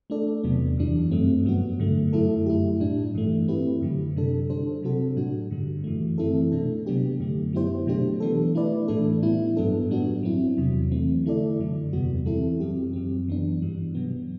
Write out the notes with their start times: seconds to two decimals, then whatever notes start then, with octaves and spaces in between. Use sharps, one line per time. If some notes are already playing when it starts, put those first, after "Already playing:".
0.10 A3 D4 A4 D5
0.43 E2 C3 F#3 B3
0.78 F#2 E3 G3 D4
1.11 G2 F#3 A3 C4
1.45 G2 F#3 B3 F#4
1.79 G2 D3 A3
2.13 F#2 F#3 A3 E4 A4
2.46 A3 E4 G4
2.80 A2 G3 D4
3.15 G2 E3 A3
3.48 A3 C4 E4 G4 B4
3.81 F#2 D3 F#3
4.16 C3 G3 D4 A4
4.49 G3 D4 A4 C5
4.83 C3 F#3 C4 F#4 A4
5.17 A2 G3 D4 F#4
5.51 G2 D3 G3
5.84 F#2 E3 A3
6.18 E3 A3 C4 E4 A4
6.52 B2 A3 D4 A4
6.86 C3 F#3 B3 D4 G4
7.20 F#2 D3 A3
7.53 F#3 B3 E4 G4 C5
7.87 B2 F#3 A3 D4 G4
8.20 E3 B3 D4 A4
8.55 A3 E4 B4 D5
8.88 A2 E3 A3 D4 A4
9.23 A2 G3 B3 E4
9.57 G2 F#3 B3 D4 A4
9.90 A2 G3 B3 D4 F#4
10.23 F#3 C4 E4
10.58 E2 C3 F#3
10.91 E3 A3 C4
11.25 D3 A3 E4 A4 D5
11.59 F#2 D3 F#3
11.93 E2 C3 G3 B3 F#4
12.26 E3 G3 C4 E4 A4
12.60 F#2 F#3 C4 G4
12.93 F#2 F#3 C4
13.28 E3 B3 D4
13.62 G2 E3 G3
13.95 B2 F#3 B3